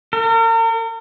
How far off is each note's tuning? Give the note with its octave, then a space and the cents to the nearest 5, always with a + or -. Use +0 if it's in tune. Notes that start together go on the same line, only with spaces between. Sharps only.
A#4 -40